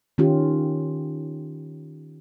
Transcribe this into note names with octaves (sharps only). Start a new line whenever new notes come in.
D#3 C#4 F4 G4